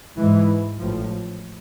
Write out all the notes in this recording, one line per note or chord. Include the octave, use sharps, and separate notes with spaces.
G#2 E3 G#3
A1 A2 F3